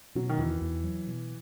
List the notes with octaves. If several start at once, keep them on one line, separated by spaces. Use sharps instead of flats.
B2 F#3
D#3
E2 E3
E2
F#3
B2